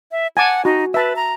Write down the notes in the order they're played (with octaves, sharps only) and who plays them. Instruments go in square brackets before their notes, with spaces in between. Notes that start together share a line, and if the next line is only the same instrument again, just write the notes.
[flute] E5
[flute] F#5 [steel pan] G#5 A5 D6
[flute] D#4 [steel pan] F#4
[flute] B4 [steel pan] E5 A5
[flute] A#5